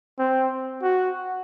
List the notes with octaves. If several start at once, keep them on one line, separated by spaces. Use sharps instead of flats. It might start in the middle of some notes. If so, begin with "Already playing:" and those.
C4
F#4